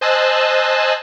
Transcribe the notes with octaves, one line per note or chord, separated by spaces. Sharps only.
C5 D#5 G#5 A5 E6 F#6